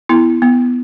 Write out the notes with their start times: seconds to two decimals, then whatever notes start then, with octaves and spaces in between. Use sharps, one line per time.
0.09 B3 E4
0.42 B3